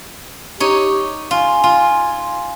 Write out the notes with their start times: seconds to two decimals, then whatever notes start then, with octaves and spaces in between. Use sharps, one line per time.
0.60 D#4 G4 C#5
1.31 F4 G#5
1.64 F4